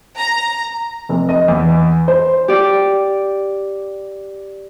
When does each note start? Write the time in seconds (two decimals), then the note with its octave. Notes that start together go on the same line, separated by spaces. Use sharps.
0.18 A#5
1.09 F1
1.29 D#5
1.48 E2
2.08 C5
2.48 G4 D5